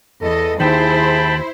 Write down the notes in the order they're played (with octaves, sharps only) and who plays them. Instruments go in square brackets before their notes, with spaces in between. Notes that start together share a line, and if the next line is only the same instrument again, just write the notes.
[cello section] E2 D#5 [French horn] A4
[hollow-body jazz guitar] D#2 D#3 [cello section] E4 C5 [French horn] G#4 [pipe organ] G5 A5 B5